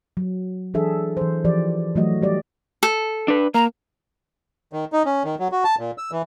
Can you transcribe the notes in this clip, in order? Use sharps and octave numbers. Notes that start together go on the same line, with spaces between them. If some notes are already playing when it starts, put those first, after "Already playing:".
F#3
E3 F#3 D4 G#4 A4 E5
E3 C5
E3 F3 G4 D5
E3 F#3 A3 F#4 D#5
G3 G4 D5
A4
D4 B4
A#3 A#5
D#3
D#4
C#4
D#3
F#3
F#4
A5
A#2
E6
E3